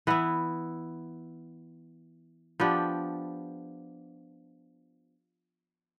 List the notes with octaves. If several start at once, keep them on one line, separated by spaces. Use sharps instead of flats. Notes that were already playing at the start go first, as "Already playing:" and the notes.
E3 B3 E4
F3 B3 D4 G4